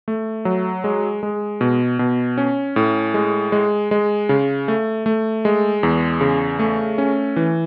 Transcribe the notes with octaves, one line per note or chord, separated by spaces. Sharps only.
A3
F#3
G#3
G#3
B2
B2
C#4
A2
G#3
G#3
G#3
C#3
A3
A3
G#3
E2
C#3
A3
C#4
E3